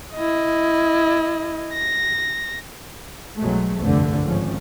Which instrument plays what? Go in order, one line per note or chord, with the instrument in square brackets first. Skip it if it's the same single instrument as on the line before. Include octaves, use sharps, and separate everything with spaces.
[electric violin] E4 D#5
A#6
[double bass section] B1 F#3 G#3 A3
F1 C2 G2 D3 A3
G#1 F3 C#4